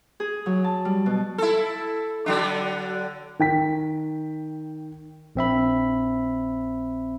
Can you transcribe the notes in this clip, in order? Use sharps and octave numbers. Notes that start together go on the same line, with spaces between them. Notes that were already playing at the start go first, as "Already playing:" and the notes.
G#4
F#3
A5
G3
B2
E4 A4
D3 F#3 D4
D#3 G5 B6
A#1 C4 E5 B5